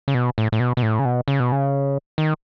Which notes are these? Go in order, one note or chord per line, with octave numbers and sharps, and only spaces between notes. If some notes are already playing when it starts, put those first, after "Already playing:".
C#3
B2
A2
A2
B2
B2
A2
C#3
B2
C#3
B2
C#3
D#3